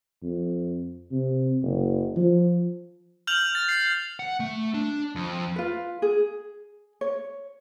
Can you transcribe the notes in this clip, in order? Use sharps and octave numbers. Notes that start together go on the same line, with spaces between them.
F2
C3
F#1
F3
F6 G6 F7 F#7
A6
C7
F#5
A3
D4
F2
F4 B4
G#4
C#5